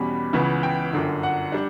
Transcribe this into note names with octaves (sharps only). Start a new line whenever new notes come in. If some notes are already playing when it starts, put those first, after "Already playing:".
Already playing: E2 B2 G3 C#4 B5
C#2 C#3 E3 B3
G5
G1 F#2 D3
F#5
G3 D4